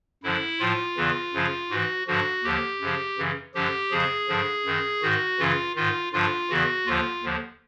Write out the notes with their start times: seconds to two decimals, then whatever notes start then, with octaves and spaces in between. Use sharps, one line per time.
0.23 F#2 D3 F3 E4
0.59 A2 F3 F4
0.97 E2 C#3 E3
1.33 F#2 C#3 F3
1.70 G#2 E3 F#4
2.07 G2 D3 F3 F#4
2.44 D#2 D3 F3 G4
2.81 F#2 C#3 F3
3.18 F#2 C#3 E3
3.55 F#2 D3 F3 G4
3.91 F2 C#3 F3 G#4
4.28 G2 D3 F3
4.65 F#2 D#3
5.02 G#2 D#3 F#4
5.39 F#2 C#3 E3 F4
5.76 G#2 D#3 F4
6.13 G2 D3 F3 F4
6.50 E2 C#3 E3 F#4
6.86 D#2 D3 F3 F4
7.23 D#2 D3 F3